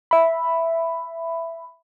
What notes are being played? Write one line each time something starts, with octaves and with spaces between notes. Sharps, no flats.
E5 B5